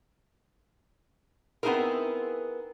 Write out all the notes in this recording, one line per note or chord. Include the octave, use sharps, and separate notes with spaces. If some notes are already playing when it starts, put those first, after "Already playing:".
B3 C4 D#4 E4 G#4 A#4